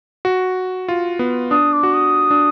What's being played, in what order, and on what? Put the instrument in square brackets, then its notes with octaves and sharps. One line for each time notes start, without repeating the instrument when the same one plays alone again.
[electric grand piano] F#4
F4
B3
[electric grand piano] D4 [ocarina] D#6
[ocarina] D6
[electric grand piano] F#4
[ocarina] D#6
[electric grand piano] D4